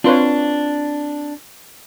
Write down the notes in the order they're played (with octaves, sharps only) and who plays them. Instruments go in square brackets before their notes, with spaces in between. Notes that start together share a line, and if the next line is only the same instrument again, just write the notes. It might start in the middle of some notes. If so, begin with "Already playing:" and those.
[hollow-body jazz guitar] C4 C6 [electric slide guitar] D4 [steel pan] F4 B4 C#5